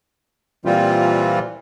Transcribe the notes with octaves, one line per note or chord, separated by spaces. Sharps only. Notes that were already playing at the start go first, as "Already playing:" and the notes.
A#2 E3 G3 C4 F4